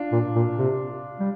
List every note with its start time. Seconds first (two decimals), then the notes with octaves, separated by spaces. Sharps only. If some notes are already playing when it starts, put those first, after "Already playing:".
Already playing: D4 F4
0.12 A#2
0.35 A#2
0.58 C3
1.20 G3